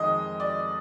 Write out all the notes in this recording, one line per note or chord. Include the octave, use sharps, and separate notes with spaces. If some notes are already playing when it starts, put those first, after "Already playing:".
Already playing: F2 D#3 G#3 D#5
D5